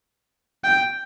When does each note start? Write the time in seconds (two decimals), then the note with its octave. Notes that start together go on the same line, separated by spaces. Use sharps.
0.64 G5